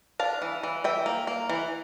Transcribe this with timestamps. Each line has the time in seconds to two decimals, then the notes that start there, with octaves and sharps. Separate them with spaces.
0.20 D4 F5 A5
0.42 E3
0.63 E3
0.84 E3 E5 G5
1.06 A#3
1.27 A#3
1.49 E3